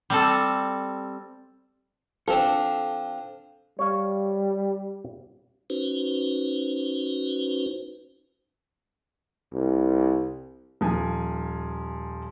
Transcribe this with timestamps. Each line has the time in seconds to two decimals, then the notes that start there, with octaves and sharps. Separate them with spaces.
0.10 G3 C4 A4
2.28 F3 C4 D4 A4
3.79 G3 C#5 F5
5.70 C#4 D#4 F#4 B4 C5
9.54 C2
10.81 D#1 F3 G#5